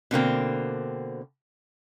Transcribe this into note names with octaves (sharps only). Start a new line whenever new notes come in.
B2 D3 A#3 C4